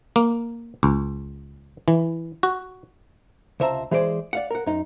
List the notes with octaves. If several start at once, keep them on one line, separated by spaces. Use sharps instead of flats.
A#3
C#2
E3
F#4
C#2 C3 C5 E5 A5 A#5
E3 G#3 G#4 C5 D5
D5 F5 F#5
A#4 F#5
F#2 D#4